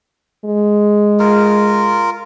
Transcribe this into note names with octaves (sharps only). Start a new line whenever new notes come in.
G#3
F4 A#4